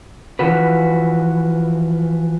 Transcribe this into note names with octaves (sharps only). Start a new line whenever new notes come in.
E3 F3 F#4 B4